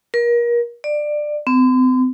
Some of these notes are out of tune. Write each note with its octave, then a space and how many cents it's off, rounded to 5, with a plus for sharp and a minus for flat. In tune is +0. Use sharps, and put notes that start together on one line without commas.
A#4 +30
D5 +20
C4 -40